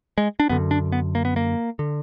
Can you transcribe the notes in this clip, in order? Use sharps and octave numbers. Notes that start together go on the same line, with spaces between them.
G#3
D4
F#2 D3 B3
D4
B3
A#3
B3
A#3
D3